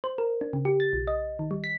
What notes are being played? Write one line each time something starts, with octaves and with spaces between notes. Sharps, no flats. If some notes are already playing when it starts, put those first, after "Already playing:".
C5
A#4
D4
C#3
G4
A6
B1
D#5
D#3
G3
B6